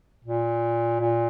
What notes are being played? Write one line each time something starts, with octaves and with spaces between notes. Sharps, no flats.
A#2
A#2